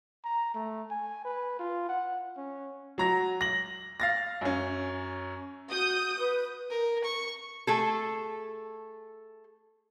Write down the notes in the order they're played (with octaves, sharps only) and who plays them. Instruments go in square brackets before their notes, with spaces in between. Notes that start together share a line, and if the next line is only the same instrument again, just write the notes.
[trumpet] A#5
A3
G#5
B4
F4
F#5
C#4
[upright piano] F#3 A#5 A#6
A#6 F#7
F5 A6 A#6
F#2 C#4
[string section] F#4 D#6 G6
[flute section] B4
[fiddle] A#4
C#6
[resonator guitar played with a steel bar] A3 G#4 A4